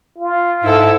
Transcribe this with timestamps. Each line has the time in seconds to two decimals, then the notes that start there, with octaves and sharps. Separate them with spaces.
0.18 F4
0.64 G#2 E4 A4